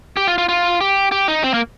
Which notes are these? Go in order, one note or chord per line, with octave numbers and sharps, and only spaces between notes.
G4
F4
F4
F4
G4
G4
D#4
C4
A#3